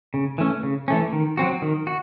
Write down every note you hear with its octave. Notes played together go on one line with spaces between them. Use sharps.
C#3
E3 A3 C#4
C#3
E3 A3 C#4
D#3
F#3 C4 F#4
D#3
F#4